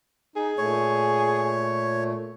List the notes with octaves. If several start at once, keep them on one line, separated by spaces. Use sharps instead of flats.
D#4 G#4
A#2 A3 C#5